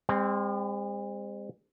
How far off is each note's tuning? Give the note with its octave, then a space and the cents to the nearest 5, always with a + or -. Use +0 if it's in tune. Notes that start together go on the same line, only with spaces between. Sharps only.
G#3 -45 C4 +0